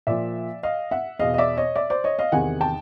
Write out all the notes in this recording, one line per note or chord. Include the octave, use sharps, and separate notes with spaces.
A#2 F3 D5 E5
D#5 F5
E5 F#5
E2 B2 D#5 F5
D#5
D5 E5
C#5 D#5
D5 E5
C5 D5
C#5 D#5
D#5 F5
E2 C3 D#3 F#5 G#5
G5 A5